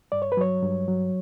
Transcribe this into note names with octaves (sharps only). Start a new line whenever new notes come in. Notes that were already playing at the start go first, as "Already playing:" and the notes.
G2 D5
C#5
B4
F#3 C#5
G2
F#3